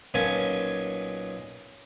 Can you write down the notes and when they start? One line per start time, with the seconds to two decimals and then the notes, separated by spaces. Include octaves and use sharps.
0.14 B1 A#2 C#4 G#5 A5